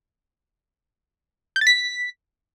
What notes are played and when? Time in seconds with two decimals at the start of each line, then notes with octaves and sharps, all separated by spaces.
1.56 G6
1.61 A6
1.67 B6